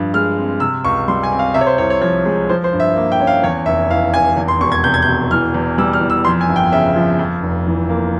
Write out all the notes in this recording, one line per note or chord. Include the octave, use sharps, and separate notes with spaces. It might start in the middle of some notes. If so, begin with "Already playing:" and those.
Already playing: G2 F3
G#3 F6
C4
C3 E6
C#2 C#6
G3 C6
G#5
C4
F5
C3 E5
C#5
C5
C2 C#5
C#5
F3 C#5
G#3
F3 C5
C5
G2
E5
A#3
G5
C#4
F5
E2 C#5
F1 E5
E3 F5
F1 G#5
E2
C6
E1 C#6
G#6
C3 G6
G#6
G6
E1
E3 F6
E2
G3 E6
F6
E2
E6
F2 C6
G#5
G1
G5
C#3 E5
F3
F2
F1
E3
A#3